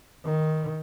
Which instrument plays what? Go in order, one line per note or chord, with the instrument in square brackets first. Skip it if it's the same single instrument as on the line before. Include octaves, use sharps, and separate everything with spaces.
[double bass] D#3